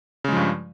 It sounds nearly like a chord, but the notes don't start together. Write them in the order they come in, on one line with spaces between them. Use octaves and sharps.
C#3 G#3 F3 G2